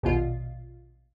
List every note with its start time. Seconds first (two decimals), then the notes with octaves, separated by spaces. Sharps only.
0.03 A#1 D#2 B2 F4